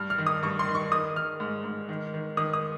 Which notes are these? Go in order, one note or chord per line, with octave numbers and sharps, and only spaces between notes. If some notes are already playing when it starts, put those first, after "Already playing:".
Already playing: G2 F6
F6
D#3
D#6
G2 C#6
C6
D#3
C#6
D#3 D#6
D#3 F6
G#2
G#2
D#3
D#3
D#3 D#6
D#6